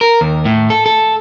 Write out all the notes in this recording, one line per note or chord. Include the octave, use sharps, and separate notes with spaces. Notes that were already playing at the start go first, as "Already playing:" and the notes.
A#4
D#2
A2
A4
A4